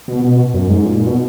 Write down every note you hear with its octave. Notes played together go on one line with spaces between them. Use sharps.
B2
B2
F#2
G#2
A#2
A#2
B2